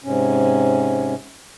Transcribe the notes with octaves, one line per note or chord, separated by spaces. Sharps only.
G#2 C3 C#4